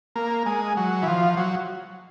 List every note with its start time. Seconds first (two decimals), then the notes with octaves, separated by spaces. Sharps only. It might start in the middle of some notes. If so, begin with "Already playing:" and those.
0.16 A#3
0.46 G#3
0.77 F#3
1.03 E3
1.07 F3
1.37 F#3